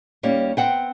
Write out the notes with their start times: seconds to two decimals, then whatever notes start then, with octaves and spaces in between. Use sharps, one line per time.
0.23 D#2 G3 A#3 C#4
0.57 B3 C4 F#5 G5